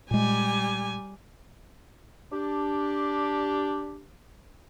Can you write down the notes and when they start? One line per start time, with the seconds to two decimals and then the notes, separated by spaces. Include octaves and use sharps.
0.11 A#2 G3 G#3 G#5
2.32 D4 G4